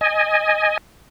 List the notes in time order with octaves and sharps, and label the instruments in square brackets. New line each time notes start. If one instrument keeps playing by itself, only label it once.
[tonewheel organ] D#5 G#5